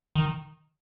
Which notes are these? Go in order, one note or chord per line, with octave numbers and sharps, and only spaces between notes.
D#3